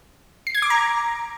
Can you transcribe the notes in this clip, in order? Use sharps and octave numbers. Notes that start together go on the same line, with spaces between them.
C7
G#6
D6
A#5